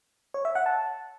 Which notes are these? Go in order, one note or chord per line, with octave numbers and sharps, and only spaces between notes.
C#5
E5
F#5
A5